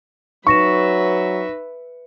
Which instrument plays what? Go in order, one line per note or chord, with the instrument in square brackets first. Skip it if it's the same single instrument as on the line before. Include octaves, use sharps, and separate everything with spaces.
[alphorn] F#3 [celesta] D#4 A#6 E7 [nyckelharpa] B4 E5 [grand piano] C#6